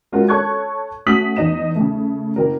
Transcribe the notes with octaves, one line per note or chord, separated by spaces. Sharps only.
G#3 C#4 F4 F#4 A#4
A4 C#5 C#6 F#6 G#6
A3 C#4 F#4 D#6 B6 F#7
E2 D#4 D#5 E7
C#3 A3
F#1 A#4